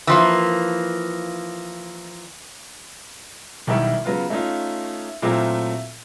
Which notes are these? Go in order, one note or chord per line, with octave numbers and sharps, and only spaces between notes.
E3 F3 A#3
B1 D#3 G3 E4 C#6
C#3 F#3 B3 F4
A3 C#4 D#4 F4
A#2 F#3 A3 C4 E4 F4